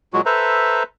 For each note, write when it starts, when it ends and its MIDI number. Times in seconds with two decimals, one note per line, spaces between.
0.14 0.21 46
0.14 0.21 54
0.14 0.21 56
0.14 0.21 66
0.26 0.83 69
0.26 0.83 71
0.26 0.83 72
0.26 0.83 76
0.26 0.83 82